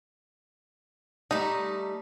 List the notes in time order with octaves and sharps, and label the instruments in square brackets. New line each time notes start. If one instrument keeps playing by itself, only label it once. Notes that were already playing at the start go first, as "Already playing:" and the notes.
[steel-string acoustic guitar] G3 A3 [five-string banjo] D#4